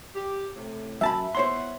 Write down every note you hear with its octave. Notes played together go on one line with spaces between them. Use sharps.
G4
A2 C3
F#2 E5 A5 B5
B3 E4 C5 C#5 F#5 C6